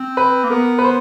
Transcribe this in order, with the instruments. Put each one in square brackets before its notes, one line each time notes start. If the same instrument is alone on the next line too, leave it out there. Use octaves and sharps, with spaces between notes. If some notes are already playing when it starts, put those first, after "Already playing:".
Already playing: [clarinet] C4
[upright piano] B4
[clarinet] A#3
[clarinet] B3 [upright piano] A#4
[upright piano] B4
C5